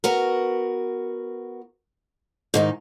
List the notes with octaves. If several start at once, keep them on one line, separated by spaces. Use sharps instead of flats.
B3 F#4 A#4
G#2 D#3 D#4